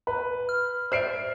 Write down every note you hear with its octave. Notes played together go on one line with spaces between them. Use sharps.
B4
F6
C5 D5 E5 F6 C7 D7